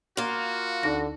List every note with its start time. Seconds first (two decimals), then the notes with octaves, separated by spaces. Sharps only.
0.17 A#3 F4 F#4
0.83 D2 D3 D#4 A#6